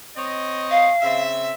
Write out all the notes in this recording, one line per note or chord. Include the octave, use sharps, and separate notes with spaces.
C4 C#5 D#5
F5
C#3 C4 E5